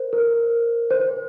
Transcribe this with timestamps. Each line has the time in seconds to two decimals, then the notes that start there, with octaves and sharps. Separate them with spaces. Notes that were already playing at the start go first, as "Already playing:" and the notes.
Already playing: A#4 C5
0.13 A#4
0.90 C5